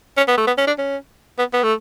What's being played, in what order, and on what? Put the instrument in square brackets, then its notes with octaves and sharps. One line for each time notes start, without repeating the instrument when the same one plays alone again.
[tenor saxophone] C#4
B3
A3
B3
C#4
D4
C#4
B3
B3
A3